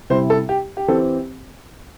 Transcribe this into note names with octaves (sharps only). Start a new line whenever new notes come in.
C3 G3 E4 C5
A4
G4
G4
E3 C4 G4 A4 C5